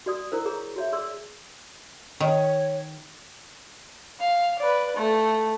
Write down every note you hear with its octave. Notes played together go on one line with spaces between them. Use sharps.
F#4 D5 D#6
E4 A#4 C5
G#4 C#5 A#5 C#6
F#4 C#5 E5
G#4 D5 C6 E6
D#3 C#5
F5
B4 D5
A3